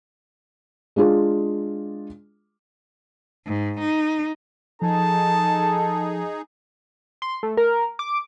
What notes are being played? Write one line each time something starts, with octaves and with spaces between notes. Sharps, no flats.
G#3 D4 F4 G#4
G#2
D#4
F3 D#4 G#4 A4 A5
C6
A3
A#4
D6